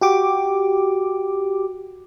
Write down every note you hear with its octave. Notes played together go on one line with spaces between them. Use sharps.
F#4 G4 D6